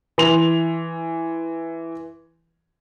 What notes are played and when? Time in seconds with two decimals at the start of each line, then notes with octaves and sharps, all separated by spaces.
0.18 E3 C6 F7